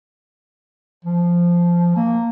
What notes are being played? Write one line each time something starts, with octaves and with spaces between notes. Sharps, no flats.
F3
A#3